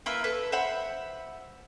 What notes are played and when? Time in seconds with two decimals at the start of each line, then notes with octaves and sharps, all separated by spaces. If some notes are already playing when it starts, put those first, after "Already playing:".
0.06 A#3 E4 B4 E5
0.24 A4 B4
0.52 C5 E5 F#5 B5